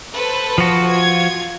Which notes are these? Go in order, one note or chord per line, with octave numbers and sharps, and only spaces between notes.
A4 B4 C5
F3 F#4
F4 G#6